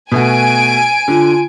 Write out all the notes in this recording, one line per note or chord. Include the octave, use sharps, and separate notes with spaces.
B2 A3 F#4 G#5 D7
D3 F4